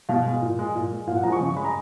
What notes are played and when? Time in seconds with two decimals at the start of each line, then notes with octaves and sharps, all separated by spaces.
0.09 B2 F5
0.26 G#3
0.42 A#2
0.59 G#3
0.75 A#2
0.91 G#3
1.07 A#2 F5
1.16 F#5
1.23 F3 G#3 A#5
1.32 C#6
1.41 C#3
1.49 C#6
1.56 G#3 B5
1.65 A#5